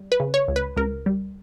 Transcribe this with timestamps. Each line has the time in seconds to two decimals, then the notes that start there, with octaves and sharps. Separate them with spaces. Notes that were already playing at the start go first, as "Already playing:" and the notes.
Already playing: G3
0.12 B4
0.20 C#3
0.34 C#5
0.48 C#2
0.56 B4
0.76 C#2 A#4
1.06 G3